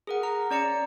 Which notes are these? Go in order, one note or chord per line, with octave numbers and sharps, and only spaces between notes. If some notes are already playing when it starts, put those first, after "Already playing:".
G#4 A#4 F#5
A#5
C#4 D5 A#5 C#7